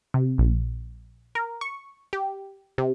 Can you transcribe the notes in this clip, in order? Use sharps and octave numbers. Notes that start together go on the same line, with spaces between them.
C3
A#1
A#4
C#6
G4
C3